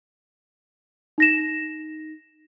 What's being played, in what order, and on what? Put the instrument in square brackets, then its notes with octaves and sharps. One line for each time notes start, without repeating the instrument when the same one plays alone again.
[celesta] D#4 A#6 E7